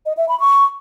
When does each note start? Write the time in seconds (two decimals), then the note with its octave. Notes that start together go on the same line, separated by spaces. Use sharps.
0.06 D#5
0.17 E5
0.29 B5
0.40 C#6